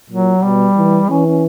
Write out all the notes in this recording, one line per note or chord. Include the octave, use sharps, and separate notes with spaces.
A#2 F#3
B2 G3
E3
E3 C#4
C#4